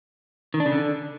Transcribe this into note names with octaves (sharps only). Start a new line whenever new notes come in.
D#3
D4
C#3
D3